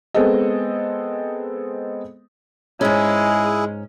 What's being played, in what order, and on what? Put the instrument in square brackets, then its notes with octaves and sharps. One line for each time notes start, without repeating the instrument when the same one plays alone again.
[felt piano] G#3 B3 C4 G#4 A4 D#5
[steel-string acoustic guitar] G#2 C#4 [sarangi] G#3 [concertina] E4 G#4